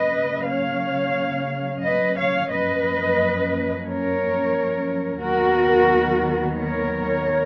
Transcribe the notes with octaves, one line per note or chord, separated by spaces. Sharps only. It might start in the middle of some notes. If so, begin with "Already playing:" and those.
Already playing: C#3 F#3 A#3 C#4 B4 D#5
C#5 F5
B4 D#5
C#5 F5
F#2 F3 A#3 C#4 B4 D#5
A#4 C#5
D#2 D#3 F#3 B3 F#4 A#4
A#4 C#5